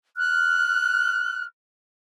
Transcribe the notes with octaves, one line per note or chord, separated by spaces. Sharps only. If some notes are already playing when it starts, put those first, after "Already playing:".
F6 F#6